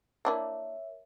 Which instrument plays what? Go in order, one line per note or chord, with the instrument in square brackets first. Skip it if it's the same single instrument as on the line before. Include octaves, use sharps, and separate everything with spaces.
[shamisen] A#3 D4 E4 [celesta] A#4 C#5 E5